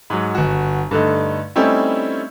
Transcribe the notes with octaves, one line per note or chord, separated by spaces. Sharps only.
G#2 F#3
G1 F#4
G2 D3 A3 D#4
G3 A3 C4 C#4 D#4 E4